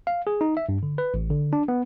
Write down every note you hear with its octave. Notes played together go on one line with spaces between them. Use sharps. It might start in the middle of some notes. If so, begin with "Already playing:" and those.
F5
G#4
D#4
E5
G2
D3
B4
A1
D3
D4
B3